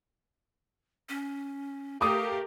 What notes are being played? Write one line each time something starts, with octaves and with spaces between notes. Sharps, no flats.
C#4
A3 G4 A#4 F5 D6 D#6